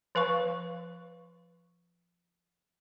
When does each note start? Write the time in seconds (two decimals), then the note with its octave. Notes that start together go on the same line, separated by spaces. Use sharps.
0.15 F3 B4 F5 C#6